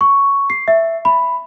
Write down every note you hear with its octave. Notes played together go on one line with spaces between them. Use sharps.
C#6
C7
E5
B5